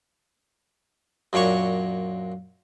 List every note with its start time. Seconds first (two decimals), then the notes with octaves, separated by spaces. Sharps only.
1.33 F#2 A#2 D4 C#5 C#6